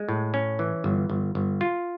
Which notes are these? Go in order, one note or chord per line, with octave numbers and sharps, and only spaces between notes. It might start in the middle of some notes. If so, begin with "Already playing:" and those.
Already playing: G#3
A2
C#4
E3
G1
G1
G1
F4